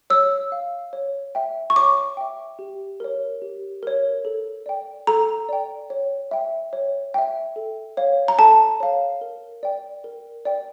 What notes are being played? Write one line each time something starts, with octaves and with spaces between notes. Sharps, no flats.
C#5 E6
F5
C#5
E5 G5
C#6
C#5 D6
E5 G5
G4
A#4 C#5
G4
A#4 C#5
A4
D5 G5
A4 A#5
D5 G5
C#5
E5 G5
C#5
E5 G5
A4
C#5 F5
A#5
A4 A5
C#5 F5
A#4
D5 G5
A#4
D5 G5